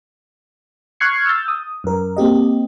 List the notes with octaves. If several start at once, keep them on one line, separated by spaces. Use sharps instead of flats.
C#6 F6 F#6 G#6 C7 C#7
E6 F6 G6 A6
D#6
F#2 A#4
A#3 C4 G4 D#5